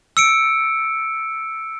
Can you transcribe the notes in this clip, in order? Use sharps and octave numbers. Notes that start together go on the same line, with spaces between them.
E6 C#7 D7